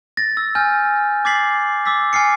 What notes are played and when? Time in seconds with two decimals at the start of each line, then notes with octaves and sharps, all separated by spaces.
0.17 A6 A#6
0.37 E6
0.55 G#5 F6 G6
1.25 D6 G#6 A6 B6 C7 F#7
1.85 D6 E6 A6 B6
2.13 G#5 F6 C7 C#7